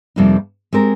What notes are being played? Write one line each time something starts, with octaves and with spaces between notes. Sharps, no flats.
F2 C3 G3 A#3 D#4
G#3 C4 G4 A#4